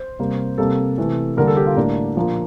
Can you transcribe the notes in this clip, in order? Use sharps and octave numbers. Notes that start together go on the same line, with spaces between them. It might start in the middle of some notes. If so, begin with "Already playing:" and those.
Already playing: C5
C3 G3 A#3
C3 G3 A#3 A4
C3 E3 A3
D3 G3 A#3 A#4
A4
G4
F4
A2 G3 A#3 D4
A#2 F3 A#3